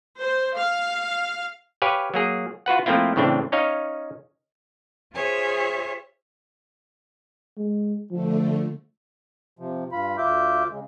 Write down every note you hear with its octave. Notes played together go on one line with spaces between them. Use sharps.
C5
F5
G4 B4 C#5 F5 G#5
F#3 A#3 G#4
F4 F#4 B4 F#5
F3 A3 A#3 C4 E4 F4
A2 C#3 E3 C4 D4
C#4 D#4 C#5 D#5 F5
F4 G#4 C5 C#5 E5
G#3
D3 F3 A3
C3 F3
G2 F4 B5
D2 F4 E5 D6 G6
C#3 G#3